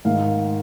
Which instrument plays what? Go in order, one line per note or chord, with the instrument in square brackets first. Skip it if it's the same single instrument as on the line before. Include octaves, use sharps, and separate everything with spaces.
[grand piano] G#2 D#3 G#3 F5